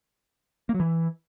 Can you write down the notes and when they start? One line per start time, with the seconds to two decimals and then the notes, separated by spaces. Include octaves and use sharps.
0.69 A#3
0.74 F#3
0.80 E3